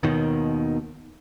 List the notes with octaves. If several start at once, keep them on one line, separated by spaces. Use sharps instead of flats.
D#2 B2 D#3